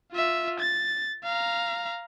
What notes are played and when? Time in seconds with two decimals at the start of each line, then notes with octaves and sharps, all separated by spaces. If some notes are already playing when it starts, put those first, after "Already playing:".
0.13 F4 E5
0.60 A6
1.24 F5 A#5